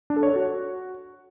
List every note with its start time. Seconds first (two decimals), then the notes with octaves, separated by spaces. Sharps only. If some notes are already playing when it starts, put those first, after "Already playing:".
0.10 D4
0.16 A4
0.23 C#5
0.29 A4
0.36 F#4